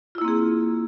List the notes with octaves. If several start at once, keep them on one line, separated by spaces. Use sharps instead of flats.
A#3 C4 E4 F4 G#4